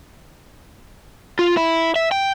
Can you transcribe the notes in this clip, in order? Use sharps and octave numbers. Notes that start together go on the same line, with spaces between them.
F4
E4
E5
G5